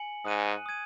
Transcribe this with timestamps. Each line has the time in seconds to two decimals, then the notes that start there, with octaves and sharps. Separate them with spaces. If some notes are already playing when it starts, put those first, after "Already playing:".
Already playing: G#5 C#7 F#7
0.25 G#2 D#6 F#6 D#7
0.66 D#6 G#6 D#7